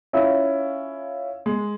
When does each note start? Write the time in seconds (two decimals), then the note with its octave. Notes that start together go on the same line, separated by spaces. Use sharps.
0.13 C#4 E4 F4
1.46 G#3